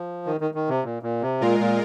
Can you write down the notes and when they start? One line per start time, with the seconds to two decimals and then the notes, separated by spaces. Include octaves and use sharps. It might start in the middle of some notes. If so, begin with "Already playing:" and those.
Already playing: F3
0.26 D#3
0.41 D#3
0.54 D#3
0.69 C3
0.84 A#2
1.03 A#2
1.22 C3
1.40 A#2 G#3 F4 A#4
1.60 A#2